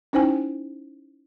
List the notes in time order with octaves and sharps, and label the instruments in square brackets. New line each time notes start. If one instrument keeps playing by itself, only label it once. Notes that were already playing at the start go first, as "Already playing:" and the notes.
[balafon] C#4 D#4 E4 C5 G5 G#5